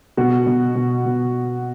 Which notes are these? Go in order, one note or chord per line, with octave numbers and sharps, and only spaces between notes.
B2 F#4
B2
B2
B2